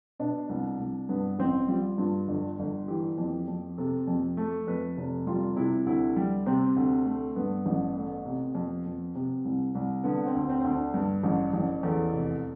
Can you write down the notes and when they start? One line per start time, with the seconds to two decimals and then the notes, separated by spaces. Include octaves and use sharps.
0.20 B2 D4
0.49 C2
0.79 C2
1.09 G2 B3
1.39 A1 C4
1.68 G3 F4
1.98 G2 F4
2.28 G1
2.59 G1
2.88 E3 G4
3.18 F2
3.48 F2
3.78 C3 A4
4.07 F2
4.37 A3
4.67 F2 B4
4.97 F1
5.27 G3 F4
5.56 C3 E4
5.86 D2 E4
6.17 G3
6.46 C3 C4
6.76 D2
7.06 A3
7.36 G2 B3
7.66 A1
7.96 A3
8.26 C3
8.55 F2
8.86 F2
9.15 C3
9.45 C2
9.75 C2
10.04 D3 B3
10.26 C4
10.35 D2
10.49 C4
10.60 D2 C4
10.71 D4
10.94 G2
11.23 A1
11.53 A1
11.83 E2 A4
12.13 F1